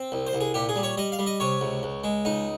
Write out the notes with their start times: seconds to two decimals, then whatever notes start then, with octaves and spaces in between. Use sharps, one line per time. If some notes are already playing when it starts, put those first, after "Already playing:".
Already playing: C4
0.12 C2
0.27 C5
0.33 C2
0.41 G#4
0.54 A#2 G4
0.69 G#4
0.76 G3
0.83 C#5
0.97 G3 D#5
1.12 F5
1.19 G3
1.26 D#5
1.40 C3 C#5
1.61 C#2
1.83 C#2
2.04 G#3
2.25 C#2 D#4